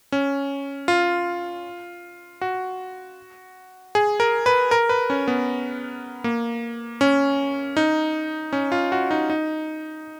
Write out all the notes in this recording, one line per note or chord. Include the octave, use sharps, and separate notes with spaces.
C#4
F4
F#4
G#4
A#4
B4
A#4
B4
C#4
B3
A#3
C#4
D#4
C#4
F4
F#4
D#4
D#4